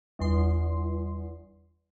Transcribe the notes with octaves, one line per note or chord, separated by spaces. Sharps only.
G1 E2 C6